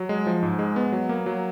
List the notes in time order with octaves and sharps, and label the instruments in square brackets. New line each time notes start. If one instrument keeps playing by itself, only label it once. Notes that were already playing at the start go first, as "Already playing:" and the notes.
Already playing: [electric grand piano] F#3
G#3
F3
G#2
G#3
B3
F#3
A#3
F#3